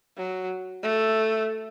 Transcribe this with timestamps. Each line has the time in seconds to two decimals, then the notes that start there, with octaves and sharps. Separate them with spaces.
0.17 F#3
0.82 A3